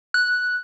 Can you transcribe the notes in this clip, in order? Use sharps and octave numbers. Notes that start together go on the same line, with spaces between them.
F#6